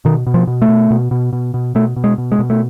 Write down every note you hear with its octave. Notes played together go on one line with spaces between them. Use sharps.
B2 D#3
B2
F3
B2
A3
B2
B2
B2
B2
B2
B2 A3
B2
G#3
B2
G#3
B2
A3